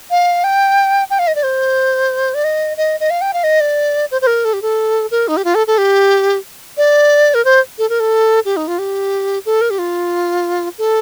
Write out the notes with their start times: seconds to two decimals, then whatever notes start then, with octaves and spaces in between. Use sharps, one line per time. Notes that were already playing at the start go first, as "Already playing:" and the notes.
0.10 F5
0.44 G5
1.10 G5
1.19 F5
1.27 D#5
1.35 D5
1.43 C5
2.34 D5
2.44 D#5
2.77 D#5
3.00 D#5
3.10 F5
3.21 G5
3.33 F5
3.44 D#5
3.60 D5
4.11 C5
4.21 C5
4.27 A#4
4.45 A4
4.53 G4
4.62 A4
5.11 A#4
5.28 D#4
5.37 G4
5.44 F4
5.55 A4
5.67 A4
5.78 G4
6.77 D5
7.34 A#4
7.45 C5
7.78 A4
7.89 A#4
8.00 A4
8.45 G4
8.56 D#4
8.67 F4
8.78 G4
9.46 A4
9.61 A#4
9.70 G4
9.78 F4
10.78 A4